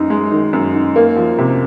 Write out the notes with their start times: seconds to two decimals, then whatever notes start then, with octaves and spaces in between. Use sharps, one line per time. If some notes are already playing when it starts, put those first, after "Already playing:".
Already playing: F#2 D#4
0.10 G#3
0.32 D#3
0.53 F#2
0.74 D#4
0.96 A#3
1.16 F3
1.38 C3